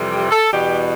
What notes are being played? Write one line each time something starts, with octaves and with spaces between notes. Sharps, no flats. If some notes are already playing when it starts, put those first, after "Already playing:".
Already playing: F2 C3 E3 G3
G4
A4
E2 B2 G3 G4